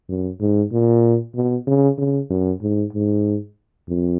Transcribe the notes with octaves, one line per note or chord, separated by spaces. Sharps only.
F#2
G#2
A#2
B2
C#3
C#3
F#2
G#2
G#2
F2